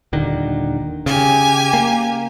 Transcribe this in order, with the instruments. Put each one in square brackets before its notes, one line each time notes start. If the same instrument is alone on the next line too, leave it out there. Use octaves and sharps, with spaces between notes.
[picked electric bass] D#1 D3 D#3
[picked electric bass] C#3 [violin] G4 G#5
[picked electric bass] A#3